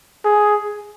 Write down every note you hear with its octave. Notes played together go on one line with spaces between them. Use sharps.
G#4